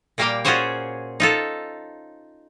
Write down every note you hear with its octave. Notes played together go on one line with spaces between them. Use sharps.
A#2 G3 A#3 G4 F5 G5
C#4 F4 F#4 G#4 C5 C#5
D#4 F4 A4